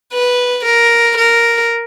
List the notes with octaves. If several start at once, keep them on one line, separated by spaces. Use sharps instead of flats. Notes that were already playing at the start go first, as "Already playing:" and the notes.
B4
A#4
A#4